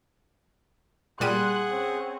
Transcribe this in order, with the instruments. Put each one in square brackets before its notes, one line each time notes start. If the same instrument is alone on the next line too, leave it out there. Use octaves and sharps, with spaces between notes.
[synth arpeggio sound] A#2 G3 D#7 [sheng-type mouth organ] G#4 F#5 [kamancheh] C6 F#6
[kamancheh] C4 C#4